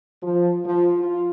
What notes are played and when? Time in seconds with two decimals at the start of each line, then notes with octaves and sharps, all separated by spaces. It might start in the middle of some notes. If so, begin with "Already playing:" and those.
0.23 F3
0.65 F3
0.98 F4